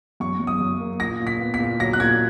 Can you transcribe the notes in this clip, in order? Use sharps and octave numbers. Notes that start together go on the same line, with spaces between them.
F#2 C#6
F#2
D#6
F#2
A#3
A#2 A#6
A#2
B6
B3
B6
A#2
F#3 A#6
F#6
A#2 G#6